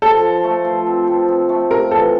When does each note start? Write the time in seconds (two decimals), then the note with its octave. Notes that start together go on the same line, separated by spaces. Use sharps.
0.02 F3 A4
0.23 F3
0.44 A3
0.65 F3
0.87 C4
1.07 C4
1.28 C4
1.49 A3
1.70 F4 A#4
1.91 E3 A4